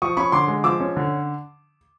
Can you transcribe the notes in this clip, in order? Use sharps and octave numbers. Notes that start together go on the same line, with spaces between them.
F3 C#6 D#6
C#4 B5 C#6
D3 C6 D6
G#3
F3 D6 E6
C#4
D3